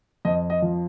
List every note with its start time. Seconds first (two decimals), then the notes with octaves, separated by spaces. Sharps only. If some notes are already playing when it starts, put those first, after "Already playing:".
0.25 F2 D#5
0.50 D#5
0.62 F3